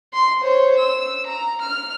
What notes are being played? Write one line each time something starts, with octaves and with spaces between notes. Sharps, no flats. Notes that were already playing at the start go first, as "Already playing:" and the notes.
C6
C5 C#5
E6
A#5
F6